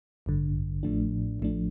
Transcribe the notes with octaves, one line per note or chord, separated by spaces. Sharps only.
A1 G2 D3
A1 A2 F3 A3 D4
A1 A2 F3 A3 D4